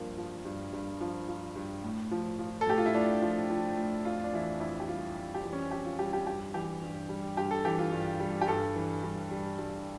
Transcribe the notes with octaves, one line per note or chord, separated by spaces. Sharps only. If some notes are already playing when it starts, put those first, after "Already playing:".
Already playing: G2 F3 A#3
F3
G2
G2
F3
F3
G2
A2
F3
F3
A4
A2 G4
F4
E4
A2 D4
F3
F3
A2
F2 F4
D4
E3 E4
D4
F2 E4
G4
G3 F4
F2
G4
E3
C#4
F2 G4
F4
G3 G4
G4
G2 G4
E3 G4
G2
G3
G2 G4
A4
E3 G4
F4
G2
G3
G4
G2 A4
E3
G2
G3
G2